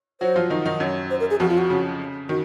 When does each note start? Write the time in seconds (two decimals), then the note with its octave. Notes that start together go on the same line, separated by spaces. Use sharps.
0.21 F#3 F#4 C5
0.36 F3 F4
0.50 D#3 D#4
0.65 D#3 D#4
0.80 F#2 F#3
1.10 C5
1.20 A#4
1.30 G#4
1.40 F2 F3 F#4
1.49 F4
1.58 F#4
1.70 C#3
2.29 D#3 F#4